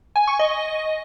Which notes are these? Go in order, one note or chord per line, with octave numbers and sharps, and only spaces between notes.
G#5
C#6
D#5